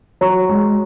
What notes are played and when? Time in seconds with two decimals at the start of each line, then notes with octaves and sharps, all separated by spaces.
0.21 F#3 C#5 A#5 C#6
0.49 G#3